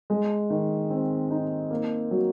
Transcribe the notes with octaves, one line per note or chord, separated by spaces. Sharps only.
G#3
D#3
C4
D#4
A#3
F#3